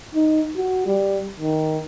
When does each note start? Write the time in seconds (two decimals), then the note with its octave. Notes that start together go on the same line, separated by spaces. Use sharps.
0.15 D#4
0.57 F#4
0.86 G3
1.40 D#3